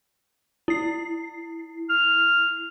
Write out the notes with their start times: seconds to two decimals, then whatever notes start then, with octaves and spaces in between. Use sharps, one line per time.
0.68 E4 C7
1.89 F6